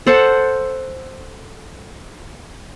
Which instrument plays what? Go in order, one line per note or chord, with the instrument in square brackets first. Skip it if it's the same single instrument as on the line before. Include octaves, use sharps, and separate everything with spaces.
[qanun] A4 C5 F#5 A5